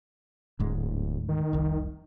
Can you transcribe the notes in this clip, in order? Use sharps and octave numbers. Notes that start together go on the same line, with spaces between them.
D1 D2 G#2 G#3
D#3
F1 C2